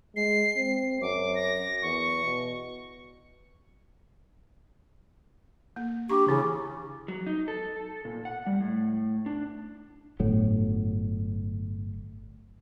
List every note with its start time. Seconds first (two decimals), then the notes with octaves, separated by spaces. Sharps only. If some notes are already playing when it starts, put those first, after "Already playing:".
0.16 G#3 C7
0.56 C4
1.02 F#2 D6
1.35 A#6
1.82 E2 C#6
2.24 B2
5.76 A#3
6.10 D4 G4 C#6
6.28 C#3 E3 C#4 E4
7.08 F#3
7.27 D#4
7.48 A4
8.05 A#2
8.25 F#5
8.47 G3
8.61 A2
9.26 D4
10.20 G1 A2 F#3